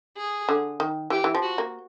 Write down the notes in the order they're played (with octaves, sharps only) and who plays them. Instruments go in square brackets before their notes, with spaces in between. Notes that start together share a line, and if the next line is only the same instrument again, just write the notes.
[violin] G#4
[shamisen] D3
D#3
[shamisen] E3 [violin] G4
[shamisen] E3
F3
[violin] F#4
[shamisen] A#3